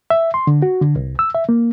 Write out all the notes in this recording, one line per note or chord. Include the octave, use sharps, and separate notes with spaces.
E5
C6
D3
F#4
D3
C2
E6
E5
A#3